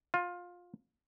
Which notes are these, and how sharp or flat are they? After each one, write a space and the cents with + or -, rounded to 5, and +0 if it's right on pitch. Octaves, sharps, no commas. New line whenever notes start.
F4 +20